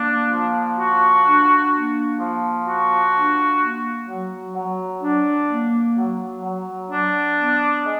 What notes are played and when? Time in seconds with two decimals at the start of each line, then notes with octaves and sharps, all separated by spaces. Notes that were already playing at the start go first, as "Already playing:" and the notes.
Already playing: A#3 D4
0.31 F3
0.78 F#4
1.25 D4
1.72 A#3
2.19 F3
2.66 F#4
3.13 D4
3.61 A#3
4.07 F#3
4.55 F#3
5.02 D4
5.49 A#3
5.96 F#3
6.43 F#3
6.90 D4
7.37 B3
7.84 G#3